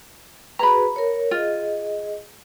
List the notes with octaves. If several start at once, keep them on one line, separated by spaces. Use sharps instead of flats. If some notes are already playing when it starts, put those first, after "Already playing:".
F#4 G#4 B4 A#5 B5
A#4 C#5
F4 G#4 D#5